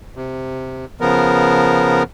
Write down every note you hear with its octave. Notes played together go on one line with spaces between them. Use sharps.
C3
C#3 F3 B3 A#4